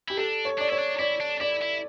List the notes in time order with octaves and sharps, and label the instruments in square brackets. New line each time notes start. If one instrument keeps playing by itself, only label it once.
[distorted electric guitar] E4 [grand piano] G4
[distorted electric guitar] D4 [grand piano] A4
[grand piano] C#5
[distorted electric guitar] D4 [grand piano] D5
[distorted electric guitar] E4 [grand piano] C#5
[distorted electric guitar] D4
[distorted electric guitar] E4 [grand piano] D5
[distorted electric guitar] D4
[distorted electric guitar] E4 [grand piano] D5
[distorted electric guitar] E4